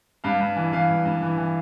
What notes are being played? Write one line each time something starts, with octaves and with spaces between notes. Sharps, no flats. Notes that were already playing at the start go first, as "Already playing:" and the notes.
G2 F5
G2
E3
E3 F5
G2
G2
E3
E3